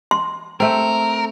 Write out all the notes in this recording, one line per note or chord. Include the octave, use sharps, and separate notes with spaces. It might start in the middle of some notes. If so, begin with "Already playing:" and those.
C6
A3 C4 A#4